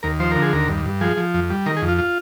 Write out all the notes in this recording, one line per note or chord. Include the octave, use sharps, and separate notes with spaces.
D#2 A#4
F3 C5
D3 A#4
G#4
D#2 A#4
G2
G2
F3 G#4
F3
F2
G3
D#3 A#4
G#4
F2
F4
F4